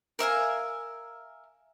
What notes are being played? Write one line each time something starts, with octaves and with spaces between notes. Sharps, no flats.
A#4 E5 F5 G#5